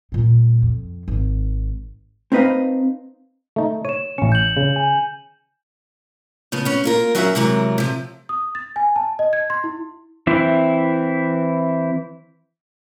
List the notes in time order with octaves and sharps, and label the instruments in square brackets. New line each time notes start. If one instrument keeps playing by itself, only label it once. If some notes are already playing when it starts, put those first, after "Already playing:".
[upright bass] A#2 G3
F2
G#1
[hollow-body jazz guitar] C4 D#4 B4 D#5 F5
[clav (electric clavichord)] A3 D#4
[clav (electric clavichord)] C#5 [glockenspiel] D#7 E7
[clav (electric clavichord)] A1 C#4 [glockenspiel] C#7
[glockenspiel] G6 F#7
[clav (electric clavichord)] C#3
[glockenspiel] G#5
[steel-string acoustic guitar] C#3 F3 B3
B3 C#4
A#3 F4 A#4
F#3 C#4 F#4 A#4 C#5 E5
C3 E3 F#3 G#3 A#4
C3 F3
[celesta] D#6
A6
G#5
A5
D#5
G#6
C6
E4
[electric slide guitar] E3 C4 E4